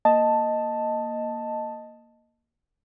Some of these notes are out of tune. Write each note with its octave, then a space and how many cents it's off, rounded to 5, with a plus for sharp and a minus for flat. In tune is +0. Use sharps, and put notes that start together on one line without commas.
A#3 +0 D#5 +0 A5 +0